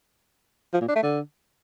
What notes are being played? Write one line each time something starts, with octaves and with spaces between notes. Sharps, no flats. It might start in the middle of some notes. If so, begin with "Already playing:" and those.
F3
A#2
D4
A3
D3